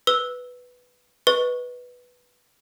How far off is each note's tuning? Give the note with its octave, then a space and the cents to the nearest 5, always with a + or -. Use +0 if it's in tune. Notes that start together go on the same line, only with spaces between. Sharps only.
B4 +0 E6 -10
B4 -5 D#5 +0 C#6 +0